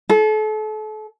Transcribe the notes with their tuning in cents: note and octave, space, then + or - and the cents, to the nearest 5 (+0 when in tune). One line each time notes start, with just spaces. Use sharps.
A4 -35